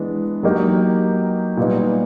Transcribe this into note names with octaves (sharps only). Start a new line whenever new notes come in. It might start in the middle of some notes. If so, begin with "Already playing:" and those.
Already playing: E3 G#3 B3 D4
F#3 A#3 D#4 G4
A#2 G3 B3 D#4